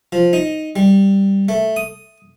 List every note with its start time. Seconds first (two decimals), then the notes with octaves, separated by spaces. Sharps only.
0.12 F3
0.33 D#4
0.76 G3
1.49 A3
1.76 D#6